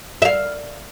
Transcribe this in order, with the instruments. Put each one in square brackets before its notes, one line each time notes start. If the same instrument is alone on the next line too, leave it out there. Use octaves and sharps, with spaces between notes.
[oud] E5 F5